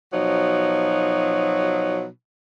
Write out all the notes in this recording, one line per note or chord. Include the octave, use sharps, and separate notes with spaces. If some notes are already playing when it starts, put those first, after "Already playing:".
B2 F3 F#3 D#4